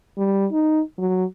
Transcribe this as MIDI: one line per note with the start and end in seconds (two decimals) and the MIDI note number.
0.18 0.46 55
0.52 0.80 63
0.98 1.25 54